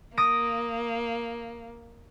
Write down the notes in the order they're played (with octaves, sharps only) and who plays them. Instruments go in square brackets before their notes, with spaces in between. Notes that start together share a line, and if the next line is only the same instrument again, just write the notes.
[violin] A#3 [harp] D#6 A#6 D7